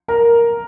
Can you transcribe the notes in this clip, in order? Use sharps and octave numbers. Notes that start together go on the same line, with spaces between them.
A#4 A#5